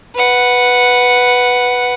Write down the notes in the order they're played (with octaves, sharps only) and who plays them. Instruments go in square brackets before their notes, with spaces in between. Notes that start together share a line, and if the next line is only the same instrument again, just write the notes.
[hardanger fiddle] B4 F#5